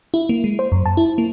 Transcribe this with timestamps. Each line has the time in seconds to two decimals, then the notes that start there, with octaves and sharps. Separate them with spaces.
0.14 E4
0.29 A#3
0.44 G#3
0.59 C5
0.72 F#2
0.86 A5
0.97 E4
1.18 A#3